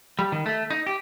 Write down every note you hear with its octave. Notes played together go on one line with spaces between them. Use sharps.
G3
D#3
A3
D#4
G4